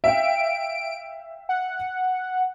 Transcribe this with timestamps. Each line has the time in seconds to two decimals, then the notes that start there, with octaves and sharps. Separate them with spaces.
0.04 E5 F5 G5 D7
1.49 F#5